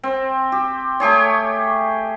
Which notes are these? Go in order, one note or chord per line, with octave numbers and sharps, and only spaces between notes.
C4
G4
A3 G4 G#4 C#5